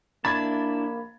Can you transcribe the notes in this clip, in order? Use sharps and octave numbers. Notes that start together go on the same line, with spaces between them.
A#3 D4 E4 A5 B5 G#6 A6